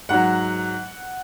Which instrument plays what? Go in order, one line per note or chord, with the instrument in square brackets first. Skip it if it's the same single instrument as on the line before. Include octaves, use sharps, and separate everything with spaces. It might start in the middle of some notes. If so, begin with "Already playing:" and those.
[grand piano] G#2 F#3 F#5